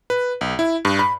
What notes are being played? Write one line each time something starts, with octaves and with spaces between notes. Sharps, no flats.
B4
B1
E4
G2
B5